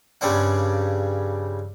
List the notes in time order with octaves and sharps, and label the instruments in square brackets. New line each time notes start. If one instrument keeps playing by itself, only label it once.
[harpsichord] G2 C#3 G3 C4 D4 F#5